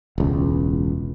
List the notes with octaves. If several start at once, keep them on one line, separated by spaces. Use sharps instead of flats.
E1 C#2